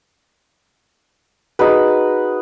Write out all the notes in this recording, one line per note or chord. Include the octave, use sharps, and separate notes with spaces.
D#4 F#4 G#4 B4